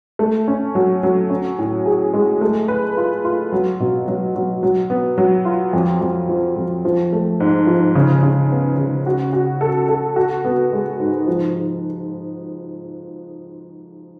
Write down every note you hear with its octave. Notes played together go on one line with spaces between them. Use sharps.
A3
C#4
F#3
F#3
C#4
A2
G#4
G#3
A3
B4
F4
F4
F#3
B2
F#3
F#3
F#3
B3
F#3
F4
F2
F2
F3
F2
F3
A3
G#2
F3
C#3
C#3
B3
C#3
F#4
F#4
A4
A4
F#4
B3
G#3
G#2
F3